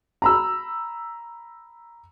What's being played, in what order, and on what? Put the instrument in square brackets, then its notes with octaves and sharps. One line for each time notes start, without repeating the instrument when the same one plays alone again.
[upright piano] A#5 B5 E6